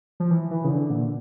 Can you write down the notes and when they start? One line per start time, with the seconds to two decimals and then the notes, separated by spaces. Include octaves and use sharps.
0.20 F3
0.31 E3
0.51 E3
0.64 C#3
0.71 D3
0.90 A#2